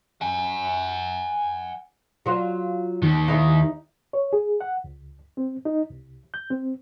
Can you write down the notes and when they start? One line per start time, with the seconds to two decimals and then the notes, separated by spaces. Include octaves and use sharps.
0.21 F#5 G#5
2.26 F#3 F4
3.03 D#2 D#3
3.28 D#4 E4 G4
4.13 C#5
4.33 G#4
4.61 F#5
4.84 C#2
5.37 C4
5.65 D#4
5.90 C2
6.34 G6
6.50 C4